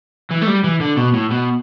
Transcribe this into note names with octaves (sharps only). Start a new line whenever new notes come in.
E3
A3
G3
E3
D3
B2
A2
B2